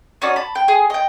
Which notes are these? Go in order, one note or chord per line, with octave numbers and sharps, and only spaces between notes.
C#4 D#4 F#4 D5
A5 B5
G5
G#4
D#5 G5